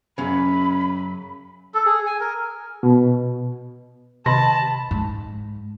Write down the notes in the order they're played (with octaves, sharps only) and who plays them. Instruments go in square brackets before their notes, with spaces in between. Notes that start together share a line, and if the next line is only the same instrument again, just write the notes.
[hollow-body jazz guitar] F#2 C#3 [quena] B5
[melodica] A4
G#4
G#5
A#4
[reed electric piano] B2
[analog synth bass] C3 [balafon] D#3 D#5 [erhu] A5 [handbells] B5 A#6
[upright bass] G#2